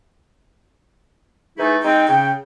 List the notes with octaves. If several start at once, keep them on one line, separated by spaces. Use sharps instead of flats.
E3 A3 D#4 E4 G#4
G#3 C4 D#4 G5
C#3 G5